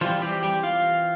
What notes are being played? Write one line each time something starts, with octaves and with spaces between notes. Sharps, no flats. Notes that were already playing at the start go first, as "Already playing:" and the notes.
E3 F3 G3 C4 F4
G3 G4
G3 G4
F4 F5